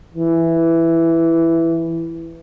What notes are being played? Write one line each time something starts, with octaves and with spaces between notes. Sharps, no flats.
E3